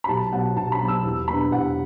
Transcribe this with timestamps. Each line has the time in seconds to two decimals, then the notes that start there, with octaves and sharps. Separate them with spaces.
0.04 B5
0.09 B1 A5
0.32 B2 F#3 F#5
0.56 B1 A5
0.72 B5
0.81 B2 F#3
0.88 E6
1.04 E2
1.28 B2 B3 D4 B5
1.51 E2 F#5